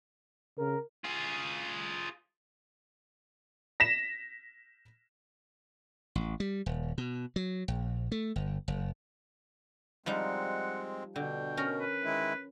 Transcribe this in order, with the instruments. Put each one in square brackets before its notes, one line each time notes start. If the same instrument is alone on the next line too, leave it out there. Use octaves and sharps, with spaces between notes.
[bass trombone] C#3 [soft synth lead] A#4
[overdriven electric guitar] F4 G#4
[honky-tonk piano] A#6 B6 E7
[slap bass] A1
G3
D#1
B2
F#3
A#1
A3
G1
F#1
[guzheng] F3 G3 D#4 [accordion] G#3 C4 [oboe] F#5
[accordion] B2 [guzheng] D3 [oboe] G5
[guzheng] C#4 A#4 A#5
[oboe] B4
[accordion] D#3 G#3 E4